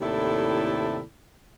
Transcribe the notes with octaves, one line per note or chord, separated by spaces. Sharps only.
D#2 A2 C3 E4 A4 D5